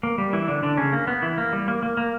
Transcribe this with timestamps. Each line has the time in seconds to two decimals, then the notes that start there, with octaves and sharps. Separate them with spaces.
0.03 A#3
0.18 G3
0.33 E3 E4
0.48 D3 D4
0.63 D3 D4
0.77 C#3 C#4
0.93 A#3
1.07 B3
1.22 E3 E4
1.38 A#3
1.53 G3
1.68 A#3
1.83 A#3
1.97 A#3